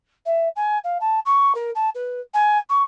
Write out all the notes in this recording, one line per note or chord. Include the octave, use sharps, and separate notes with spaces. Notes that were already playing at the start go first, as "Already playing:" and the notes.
E5
G#5
F5
A5
C#6
A#4
A5
B4
G#5
C#6